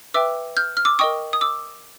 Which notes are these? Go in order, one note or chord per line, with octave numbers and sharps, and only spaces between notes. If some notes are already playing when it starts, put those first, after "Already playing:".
B4 E5 G5 D6 E6
F6 G6
F6
D6 E6
A#4 D#5 G5 C#6 D#6
D#6
D6 E6